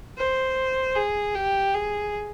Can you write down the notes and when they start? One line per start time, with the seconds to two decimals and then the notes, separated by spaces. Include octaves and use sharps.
0.18 C5
0.96 G#4
1.35 G4
1.74 G#4